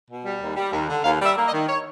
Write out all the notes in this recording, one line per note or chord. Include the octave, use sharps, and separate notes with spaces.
B2
G3
D#2
G3
D#2
D3
D#2 F5
G3 E5
A#3
D#5
D#3
C#5